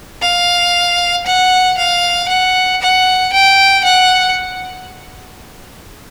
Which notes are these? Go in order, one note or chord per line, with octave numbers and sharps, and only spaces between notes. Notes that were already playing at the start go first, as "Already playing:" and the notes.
F5
F#5
F5
F#5
F#5
G5
F#5